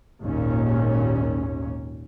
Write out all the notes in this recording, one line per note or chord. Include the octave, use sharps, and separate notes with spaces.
G#1 D#2 A#2 C#4